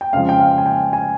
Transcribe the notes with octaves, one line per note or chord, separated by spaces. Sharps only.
G5
F2 C#3 F3 G#3 F5
G5
F5
G#5
G5
G#5